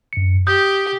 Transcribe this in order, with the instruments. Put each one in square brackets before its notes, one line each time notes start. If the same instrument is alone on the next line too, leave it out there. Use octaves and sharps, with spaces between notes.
[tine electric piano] F#2 C#7
[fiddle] G4 [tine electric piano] D#6 G6